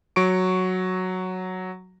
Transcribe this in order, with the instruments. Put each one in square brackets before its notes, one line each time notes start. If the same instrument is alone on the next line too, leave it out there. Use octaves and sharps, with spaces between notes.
[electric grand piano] F#3 C#6 D7